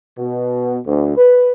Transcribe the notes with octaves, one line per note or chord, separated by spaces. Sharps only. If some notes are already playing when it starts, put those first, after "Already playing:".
B2
D2
B4